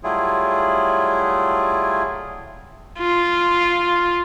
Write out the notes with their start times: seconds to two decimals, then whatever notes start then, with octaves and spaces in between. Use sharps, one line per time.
0.04 F#3 G3 A3 E4 F4 G#4
2.98 F4